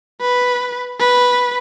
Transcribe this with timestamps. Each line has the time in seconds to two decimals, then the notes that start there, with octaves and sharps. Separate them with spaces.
0.21 B4
0.99 B4